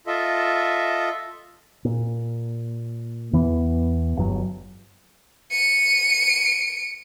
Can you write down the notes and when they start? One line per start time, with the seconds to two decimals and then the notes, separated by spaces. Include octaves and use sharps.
0.07 F4 A4 D#5 E5
1.85 A#2
3.33 E2 E3 B3
4.17 G1 G2 F#3
5.51 C#7 D#7